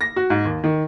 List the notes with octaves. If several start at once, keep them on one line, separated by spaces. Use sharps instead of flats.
A#6
F#4
G#2
D#2
D#3